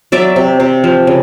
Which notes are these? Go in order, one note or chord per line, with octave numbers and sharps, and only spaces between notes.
F#3 D5 E5
C3
C3
F3
C#3